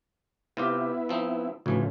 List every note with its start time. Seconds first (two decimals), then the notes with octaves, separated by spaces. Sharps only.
0.57 C3 B3 E4 F4 G4
1.09 F3 C4 D#4
1.66 D2 A2 C#3 E3 F3